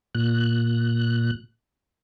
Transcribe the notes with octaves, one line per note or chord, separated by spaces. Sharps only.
A#2 F#6